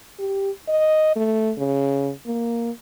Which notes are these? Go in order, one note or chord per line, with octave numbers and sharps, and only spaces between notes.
G4
D#5
A3
C#3
A#3